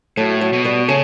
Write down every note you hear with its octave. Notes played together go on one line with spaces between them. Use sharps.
A2 F#3 A3
F#3 A3
B2
G3 B3
C#3 A3 C#4